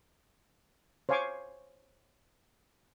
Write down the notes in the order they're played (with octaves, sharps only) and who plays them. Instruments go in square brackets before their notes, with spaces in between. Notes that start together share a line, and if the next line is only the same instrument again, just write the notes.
[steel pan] C5 C#5 F5 G#5 C#6 D6